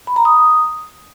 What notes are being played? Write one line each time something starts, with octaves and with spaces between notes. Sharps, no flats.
B5
A#5
D#6